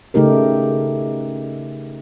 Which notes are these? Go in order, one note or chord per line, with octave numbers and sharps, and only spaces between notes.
C#3 A3 D#4 G4 A#4